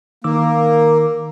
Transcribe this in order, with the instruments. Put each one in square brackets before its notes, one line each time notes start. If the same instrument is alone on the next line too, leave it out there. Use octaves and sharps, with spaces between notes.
[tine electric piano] D#3 D6 E6 [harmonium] A#3